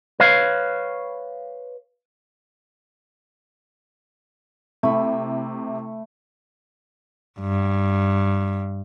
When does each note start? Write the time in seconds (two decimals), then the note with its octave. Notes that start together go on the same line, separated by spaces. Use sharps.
0.20 B4 C#5 F5
4.83 C3 A3 E4 B5
7.40 G2